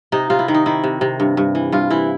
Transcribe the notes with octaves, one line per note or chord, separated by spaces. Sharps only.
C3 D#4
C3 F4
E4
D#3
D#4
D#3 E4
C3
C3
G2
G2
E3
G2 F4
E3 E4